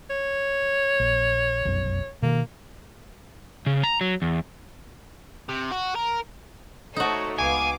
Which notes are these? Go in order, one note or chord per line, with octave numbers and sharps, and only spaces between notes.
C#5
A#1
F1 B1 F#2
B2 D#3 A#3
C#3
A#5
F#3
E2
C3
F#4
A#4
A3 D#4 F#4 A4 C5 C#5
C#2 B3 F5 G#5 D6